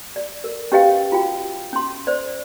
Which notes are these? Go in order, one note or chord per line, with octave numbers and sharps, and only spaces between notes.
D5
A#4
C#4 G4 B4 D#5 F5 G5
F4 F#4 G5
C#4 C6
C5 D5